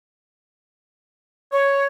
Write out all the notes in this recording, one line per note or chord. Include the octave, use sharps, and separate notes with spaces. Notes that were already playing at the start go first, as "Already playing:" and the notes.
C#5